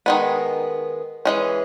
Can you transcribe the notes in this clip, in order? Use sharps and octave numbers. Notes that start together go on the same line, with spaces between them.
D#3 G#3 B3
E3 G#3 C#4